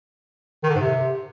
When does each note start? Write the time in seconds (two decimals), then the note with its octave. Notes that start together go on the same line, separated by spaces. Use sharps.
0.64 D#3
0.69 D3
0.75 G#2
0.81 C3